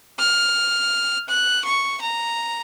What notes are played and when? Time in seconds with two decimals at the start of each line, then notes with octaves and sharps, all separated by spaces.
0.19 F6
1.29 F#6
1.65 C#6
2.01 A#5